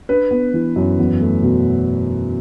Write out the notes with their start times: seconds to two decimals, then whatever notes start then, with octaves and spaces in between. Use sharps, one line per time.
0.09 D4 B4
0.31 B3
0.53 E3
0.76 F#2
0.99 E2
1.21 A3
1.43 B2